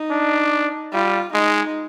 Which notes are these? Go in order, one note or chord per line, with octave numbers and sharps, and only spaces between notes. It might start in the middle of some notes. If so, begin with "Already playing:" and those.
Already playing: D#4
D4
G3 F4
G#3 D#4